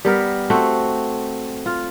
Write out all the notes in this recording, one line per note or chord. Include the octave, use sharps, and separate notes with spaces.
G3 B3 A#4
A3 C4 F#4
F4